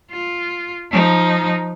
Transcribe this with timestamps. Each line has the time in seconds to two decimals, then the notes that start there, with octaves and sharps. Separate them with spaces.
0.12 F4
0.91 F3 D#4